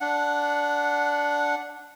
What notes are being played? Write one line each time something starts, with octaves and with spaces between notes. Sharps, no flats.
D4 F#5